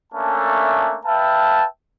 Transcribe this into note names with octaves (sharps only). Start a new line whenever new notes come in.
A3 A#3 C#4 D4 E5 A5
B4 E5 F5 G5 A5